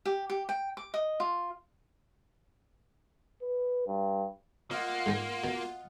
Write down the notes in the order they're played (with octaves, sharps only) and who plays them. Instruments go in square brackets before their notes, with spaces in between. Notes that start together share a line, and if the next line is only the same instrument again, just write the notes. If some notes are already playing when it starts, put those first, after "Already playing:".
[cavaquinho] G4
G4
G5
D6
D#5
F4
[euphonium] B4
G2
[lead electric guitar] A#3 [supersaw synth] F4 [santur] D#5 F5 F#5
[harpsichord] G#2 G#3 G5
B2